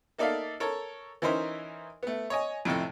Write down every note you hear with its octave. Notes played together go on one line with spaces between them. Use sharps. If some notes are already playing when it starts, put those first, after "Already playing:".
A#3 D#4 A4 D5 E5 F5
A4 A#4 C#5
E3 C#4 D#4 A#4 C5 E5
A3 B3
C#5 D#5 G#5
F2 A2 C3 A4